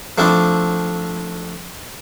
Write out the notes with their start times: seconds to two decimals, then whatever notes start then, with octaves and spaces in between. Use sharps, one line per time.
0.18 F3 A3 C4 D4 E4